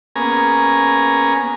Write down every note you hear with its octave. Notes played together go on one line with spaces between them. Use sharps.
A#3 B3 C#4 G#4 G#5 A#5